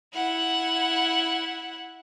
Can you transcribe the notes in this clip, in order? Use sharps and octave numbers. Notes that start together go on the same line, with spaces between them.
E4 F#5